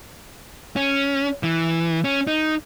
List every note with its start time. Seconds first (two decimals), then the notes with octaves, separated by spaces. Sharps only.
0.76 C#4
1.43 E3
2.04 C#4
2.27 D#4